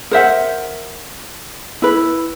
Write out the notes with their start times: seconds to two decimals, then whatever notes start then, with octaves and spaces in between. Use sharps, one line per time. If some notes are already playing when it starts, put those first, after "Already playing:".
0.11 A#4 C5 E5 F#5
1.82 E4 B4